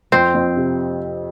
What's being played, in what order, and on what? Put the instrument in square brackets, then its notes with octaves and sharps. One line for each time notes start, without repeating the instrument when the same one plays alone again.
[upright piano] F2 [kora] C4
[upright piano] F2
C3